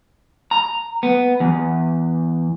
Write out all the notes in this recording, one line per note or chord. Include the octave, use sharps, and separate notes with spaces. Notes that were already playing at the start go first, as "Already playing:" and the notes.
A#5
B3
E2